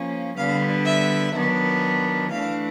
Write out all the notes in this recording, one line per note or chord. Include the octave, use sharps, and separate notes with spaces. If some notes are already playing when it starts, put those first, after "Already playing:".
Already playing: F3 A#3 C#4
D3 G3 B3 F5
E5
D#3 F#3 B3 D4
E3 A3 D4 F5